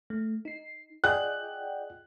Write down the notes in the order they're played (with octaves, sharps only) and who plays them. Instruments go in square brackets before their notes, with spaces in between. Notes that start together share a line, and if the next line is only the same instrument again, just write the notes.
[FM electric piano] A3
D#4 C7
[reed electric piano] F4 G#4 D#5 [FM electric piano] D5 F#5 G5 [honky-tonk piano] F#6